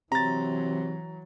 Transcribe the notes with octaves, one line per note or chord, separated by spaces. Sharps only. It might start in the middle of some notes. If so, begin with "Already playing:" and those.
C3 E3 F#3 A#5 A6